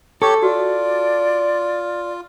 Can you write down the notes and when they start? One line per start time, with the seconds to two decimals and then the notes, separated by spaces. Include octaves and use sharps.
0.22 G4 A4 C#5 C#6
0.42 F4 F#4 D5